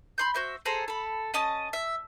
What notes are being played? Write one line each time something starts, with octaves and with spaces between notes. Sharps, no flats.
B5 C6 G6
F#4 C5 E5
G#4 A4 C5 A#5
A4 B5
C#4 D#5 A5 D#6
E5